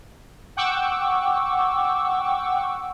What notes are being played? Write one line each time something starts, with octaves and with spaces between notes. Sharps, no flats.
F#5 G5 C#6 D6 E6